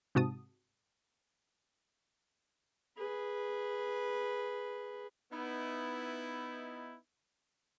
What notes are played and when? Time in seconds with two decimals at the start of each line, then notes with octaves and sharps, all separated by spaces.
0.15 G#2 C3 F#4 A5 D#6
2.97 G#4 B4
5.32 B3 D#4 E4